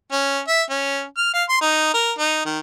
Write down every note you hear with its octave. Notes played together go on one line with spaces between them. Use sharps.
C#4
E5
C#4
F6
F5
C6
D#4
A#4
D#4
D#3